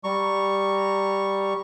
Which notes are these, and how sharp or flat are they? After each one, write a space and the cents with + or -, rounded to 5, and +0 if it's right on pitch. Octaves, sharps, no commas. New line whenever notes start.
G3 +0 A#5 -15 C#6 +0